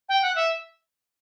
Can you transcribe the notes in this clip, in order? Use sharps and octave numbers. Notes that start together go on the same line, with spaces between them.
G5
F#5
E5